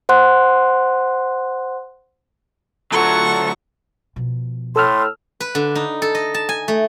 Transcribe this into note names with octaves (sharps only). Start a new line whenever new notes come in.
C5 F#5 C6 F#6
D2 F#3 F4 A4 F#5 C#6
B2 F3
A2 A4 C6 E6 F6
B4
D3
D#4
A4
D#5
A5
G#5
A3